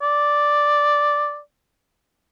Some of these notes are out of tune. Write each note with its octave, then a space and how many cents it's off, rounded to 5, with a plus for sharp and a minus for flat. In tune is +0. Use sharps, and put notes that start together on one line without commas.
D5 +0